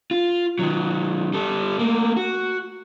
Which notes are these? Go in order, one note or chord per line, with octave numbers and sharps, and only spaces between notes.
F4
D#3 F#3
G3 A4
A3 A#3
F#4